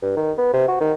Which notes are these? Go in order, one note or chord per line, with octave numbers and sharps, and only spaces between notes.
G2
D#3
B3
C3
F#4
D#3